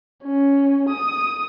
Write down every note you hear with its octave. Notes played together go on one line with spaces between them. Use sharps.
C#4
D#6